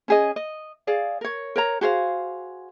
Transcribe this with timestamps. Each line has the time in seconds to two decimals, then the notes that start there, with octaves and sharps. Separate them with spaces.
0.08 C#4 G#4 D#5
0.36 D#5
0.87 G#4 D5 F5
1.21 A#4 C#5
1.56 A#4 C#5 A#5
1.81 F#4 G#4 C5 F5